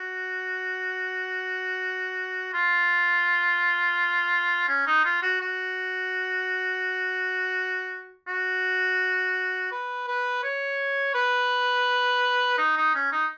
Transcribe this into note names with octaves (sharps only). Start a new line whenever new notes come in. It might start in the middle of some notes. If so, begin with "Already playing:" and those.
Already playing: F#4
F4
C#4
D#4
F4
F#4
F#4
F#4
B4
B4
C#5
B4
D#4
D#4
C#4
D#4